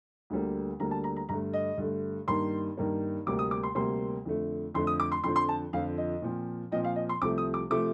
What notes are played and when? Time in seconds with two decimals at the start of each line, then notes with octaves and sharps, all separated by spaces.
0.30 D2 D3 G3 A#3
0.80 D2 D3 G3 A#3 A#5
0.91 A5
1.04 A#5
1.16 A#5
1.29 G2 D3 A3 A#5
1.53 D#5
1.78 G2 D3 A3
2.27 G2 D#3 A#3 C6
2.77 G2 D#3 A#3
3.26 D2 C3 G3 A#3 D6
3.39 D#6
3.51 D6
3.63 C6
3.75 D2 C3 G3 A#3 C6
4.25 F2 D3 A3
4.75 F2 D3 A3 C6
4.87 D#6
5.00 D6
5.12 C6
5.24 F2 D3 F3 C6
5.36 C6
5.49 A5
5.73 F2 D3 F3 F5
5.98 D#5
6.22 A#2 F3 C4
6.71 A#2 F3 C4 D#5
6.84 F5
6.96 D#5
7.09 C6
7.21 C2 C3 F3 A3 D6
7.38 D#6
7.54 D6
7.70 C3 F3 A3 D6